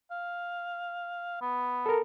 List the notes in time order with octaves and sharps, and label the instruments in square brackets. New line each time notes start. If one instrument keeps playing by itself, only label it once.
[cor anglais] F5
B3
[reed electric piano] A4 A#4